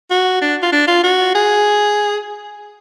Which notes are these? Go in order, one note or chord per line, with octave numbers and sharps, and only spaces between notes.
F#4
D4
F4
D4
F4
F#4
G#4